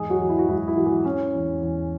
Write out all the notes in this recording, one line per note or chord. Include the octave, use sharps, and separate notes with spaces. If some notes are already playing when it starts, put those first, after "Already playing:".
Already playing: E2 G#2 G#3 G#4
F#3 F#4
E3
E4
F#4
G#2 E4
F#4
E4
E3 F#4
E3 E4
E3 C#4
E2
E2